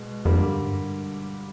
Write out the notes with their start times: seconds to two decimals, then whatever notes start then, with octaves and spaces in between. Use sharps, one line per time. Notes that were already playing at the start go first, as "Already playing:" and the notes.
Already playing: B2 G#3
0.25 F2 D3 G3 A#3
0.37 F#2
0.49 G2
0.62 G#2
0.73 G2